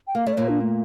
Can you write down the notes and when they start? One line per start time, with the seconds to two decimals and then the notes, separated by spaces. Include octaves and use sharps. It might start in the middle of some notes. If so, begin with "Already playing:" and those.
0.07 G5
0.15 A#3 F5
0.27 A3 C#5
0.33 D5
0.37 A#2 A#3 C#5
0.49 D4
0.61 A3